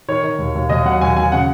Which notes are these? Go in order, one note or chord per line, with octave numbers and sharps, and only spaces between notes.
D#3 C#5
D#3
D#2
D#2
D#2 D#5
F#3 F#5
D#2 G#5
D#2 G#5
C#3 F#5